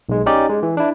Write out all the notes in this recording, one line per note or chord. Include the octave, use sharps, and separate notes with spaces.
B1 G#3
C#4 D#4 G4 D5
G#3
E3
D4 E4